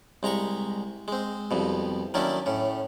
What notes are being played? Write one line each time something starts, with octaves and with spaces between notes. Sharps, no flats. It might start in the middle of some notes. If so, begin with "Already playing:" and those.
C2 G#3 A#5 B5 C#6
G#3 C4
C2 F2 B2
D#3 F#3 A#3 C#4 D4 E4
A2 C#4